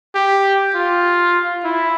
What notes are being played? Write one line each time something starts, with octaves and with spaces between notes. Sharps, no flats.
G4
F4
E4